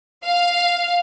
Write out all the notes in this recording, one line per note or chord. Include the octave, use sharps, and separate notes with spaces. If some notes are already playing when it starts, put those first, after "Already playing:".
F5